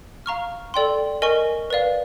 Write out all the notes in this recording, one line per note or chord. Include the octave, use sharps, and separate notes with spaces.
F5 A#5 C#6 F6
A4 D5 G5 C6
A#4 D#5 G#5 C#6
B4 D5 F5